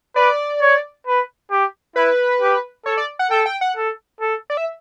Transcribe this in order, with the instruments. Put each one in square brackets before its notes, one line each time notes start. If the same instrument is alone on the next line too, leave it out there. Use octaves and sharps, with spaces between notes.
[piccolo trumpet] B4 [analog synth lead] D5
[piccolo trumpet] C#5
B4
G4
[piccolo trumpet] E4 [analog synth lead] B4
[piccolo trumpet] G4
[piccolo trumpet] A4 [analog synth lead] C#5
[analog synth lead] D5
F#5
[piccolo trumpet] A4 [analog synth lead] G5
[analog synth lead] G5
F#5
[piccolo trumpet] A4
A4
[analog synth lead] D5
E5